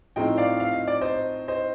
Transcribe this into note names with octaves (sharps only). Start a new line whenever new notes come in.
A2 F3 C4 D#4 D#5 G5
D5 F5
F5
D#5
D5
C5 D#5
C5 D#5